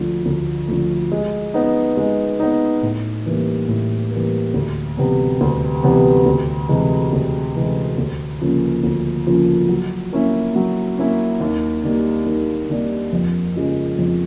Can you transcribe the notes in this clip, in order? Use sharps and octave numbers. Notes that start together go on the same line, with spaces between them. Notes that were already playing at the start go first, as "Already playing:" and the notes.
Already playing: D2 D3 F3 A3
D2
D3 F3 A3
G#3
B3 D#4
G#3
B3 D#4
A2
E3 G3 A#3
A2
E3 G3 A#3
D2
C3 E3 G3 B3
D2
C3 E3 G3 B3
D2
C3 E3 G#3
D2
C3 E3 G#3
D2
C#3 F3 A#3 C#4
D2
C#3 F3 A#3 C#4
F#3
A#3 C#4 E4
F#3
A#3 C#4 E4
D#2
D#3 G3 A#3 D4
D#2
D#3 G3 A#3 D4
F2
C#3 F3 G#3 C#4
F2